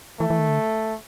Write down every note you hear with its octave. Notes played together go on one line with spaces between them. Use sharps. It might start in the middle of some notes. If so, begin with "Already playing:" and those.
E3 A3
E3
D#3
D3